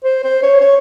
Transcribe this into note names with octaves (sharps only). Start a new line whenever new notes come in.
C5
C5
C#5
C#5